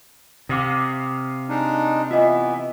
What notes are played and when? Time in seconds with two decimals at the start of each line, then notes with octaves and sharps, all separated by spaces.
0.49 C3 D#5 F5 D6
1.49 G#3 D4 D#4
2.11 E3 B3 F4 D#5 E5